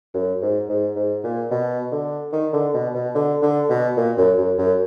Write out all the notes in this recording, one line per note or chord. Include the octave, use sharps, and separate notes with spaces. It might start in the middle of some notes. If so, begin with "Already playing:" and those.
F#2
G#2
G#2
G#2
A#2
B2
D3
D#3
D3
B2
B2
D3
D3
B2
A#2
F#2
F#2
F#2